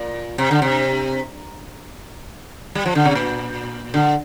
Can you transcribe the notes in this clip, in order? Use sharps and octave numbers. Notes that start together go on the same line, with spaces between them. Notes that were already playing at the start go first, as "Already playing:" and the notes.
Already playing: A#2
C3
D3
C3
G3
F3
D3
C3
A#2
D3